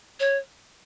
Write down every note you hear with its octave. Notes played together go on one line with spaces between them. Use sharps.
C#5